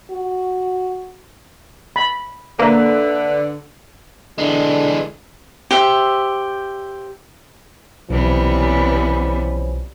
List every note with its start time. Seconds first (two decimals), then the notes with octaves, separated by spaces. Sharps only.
0.10 F#4
1.96 B5
2.59 D3 A#3 B4 E5
4.38 D3 E3 G#3
5.71 G4 C5 E5
8.10 B1 C3 E3 F3 G3 B3 C#4